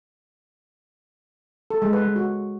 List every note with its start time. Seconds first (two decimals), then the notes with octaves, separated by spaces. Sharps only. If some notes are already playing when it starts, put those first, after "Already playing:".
1.70 A4
1.82 G#3
1.93 B4
2.04 G#3
2.16 F#4